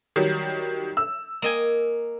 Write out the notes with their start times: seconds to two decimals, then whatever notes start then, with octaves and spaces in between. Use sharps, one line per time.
0.16 D#3 F#3 G3
0.97 E6
1.42 A#3 D#5 G#5